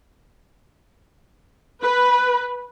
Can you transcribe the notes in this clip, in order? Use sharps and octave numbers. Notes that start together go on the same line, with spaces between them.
B4